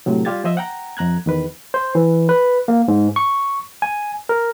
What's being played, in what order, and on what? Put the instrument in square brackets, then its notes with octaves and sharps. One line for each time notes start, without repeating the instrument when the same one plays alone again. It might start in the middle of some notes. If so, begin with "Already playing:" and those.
[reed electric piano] A2 C3 F#3
G3 F4 G4 G#6 A6
F3 C5 D#5 E5
F#5 G5 A#5
F2 A#5 F#6 G#6
E2 D#3 B4
[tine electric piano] C5
E3
B4
A#3
G#2
C#6
G#5
A#4